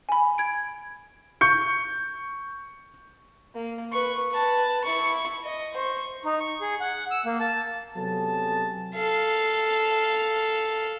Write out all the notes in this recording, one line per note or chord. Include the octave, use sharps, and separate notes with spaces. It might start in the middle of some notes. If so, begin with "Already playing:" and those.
G#5 B5
G#6 D7
C#6 G6 C#7
A#3
B4 C#6
B4 A5
E4 C#6
D#5
C5 C#6
D#4
C#6
G#4
F#5
E6
A#3
A5
C3 F#3 B3 G#4 A4 A5
A4 F5